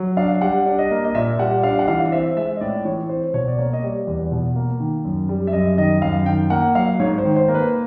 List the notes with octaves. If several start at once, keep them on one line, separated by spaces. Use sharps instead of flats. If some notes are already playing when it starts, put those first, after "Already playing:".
Already playing: F#3
D4 F5
G3 F#5
D4
D#5
A#3
D#5
A#2 E5
G3 F#5
D4 F5
F#5
E3 F5
C4 E5
G#3 E5
D#5
A2 D5
E3 C#5
C4 C5
B2 C#5
D5
A#3 C#5
D#5
G3 D5
E2
B2
A#3
D#3
F#2
G3
E5
F#2 D#5
D#3 D#5
F#2 F5
D#3 G5
A#3 F#5
F#3 F5
G#2 C#5
C5
D#3
C5
A#3
B4